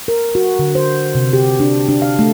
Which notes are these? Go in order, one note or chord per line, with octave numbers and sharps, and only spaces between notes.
A#4
F#4
D3
C5
C3
G4
D4
D4
F5
A3